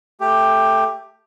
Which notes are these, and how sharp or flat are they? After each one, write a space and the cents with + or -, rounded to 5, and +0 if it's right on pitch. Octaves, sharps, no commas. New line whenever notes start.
A3 +0 G4 +10